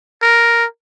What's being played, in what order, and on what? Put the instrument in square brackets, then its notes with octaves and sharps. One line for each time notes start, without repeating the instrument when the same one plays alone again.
[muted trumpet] A#4